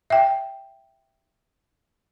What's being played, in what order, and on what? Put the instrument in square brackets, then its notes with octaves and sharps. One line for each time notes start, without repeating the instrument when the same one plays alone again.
[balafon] E5 G5